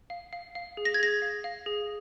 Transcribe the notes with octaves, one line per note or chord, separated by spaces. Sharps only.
F5
F5
F5
G#4
A#6
G#6
G#4 A#6
F5
F5
G#4